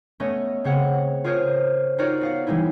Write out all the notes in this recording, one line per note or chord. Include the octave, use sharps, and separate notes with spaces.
A3 B3 C#4 C#5 D#5
C#3 C4 C#5 F#5
F4 G#4 A#4 C5 C#5
D#4 F4 F#4 A#4 C#5 D5
B3 F5 F#5
E3 G3 G#3 D#4 E4